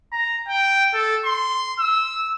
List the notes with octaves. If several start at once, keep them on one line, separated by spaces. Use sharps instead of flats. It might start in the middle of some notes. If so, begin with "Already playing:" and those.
A#5
G5
A4
C6
E6